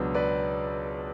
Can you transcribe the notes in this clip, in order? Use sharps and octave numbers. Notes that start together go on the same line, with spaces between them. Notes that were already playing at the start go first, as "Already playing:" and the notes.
Already playing: C#2 B2 F#3 B3 D4
B4 D5